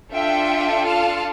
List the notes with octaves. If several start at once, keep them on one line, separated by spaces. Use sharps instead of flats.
D4 F4 A4 E5 G5
F5 A5